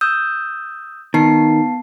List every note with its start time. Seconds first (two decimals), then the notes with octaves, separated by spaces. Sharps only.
0.01 D#6 E6 G6
1.14 D#3 B3 A5 C7